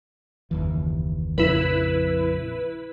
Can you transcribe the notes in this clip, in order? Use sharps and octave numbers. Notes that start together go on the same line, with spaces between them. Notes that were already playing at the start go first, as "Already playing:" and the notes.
F#1 D#2 E3
A#1 F2 C#3 E4 B4